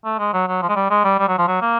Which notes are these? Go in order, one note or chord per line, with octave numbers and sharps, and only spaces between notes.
A3
G#3
F#3
F#3
F3
G#3
G3
G#3
G3
G3
F#3
F3
F#3
A#3